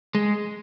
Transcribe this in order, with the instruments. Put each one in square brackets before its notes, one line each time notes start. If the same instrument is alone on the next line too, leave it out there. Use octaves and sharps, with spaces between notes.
[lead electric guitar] G#3